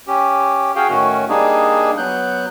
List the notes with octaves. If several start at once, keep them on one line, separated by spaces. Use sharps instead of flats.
C#4 G4
F#4 G#4 F5 G5
A2 D#3 A3 C#4 F#4
G3 A#3 D4 D#4 G#4
F#3 B3 F#6 G6